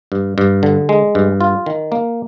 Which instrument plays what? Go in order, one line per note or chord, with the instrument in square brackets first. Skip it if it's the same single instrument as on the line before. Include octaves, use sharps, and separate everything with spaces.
[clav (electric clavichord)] G2
G2
D3
G#3
G2
F4
D#3
A#3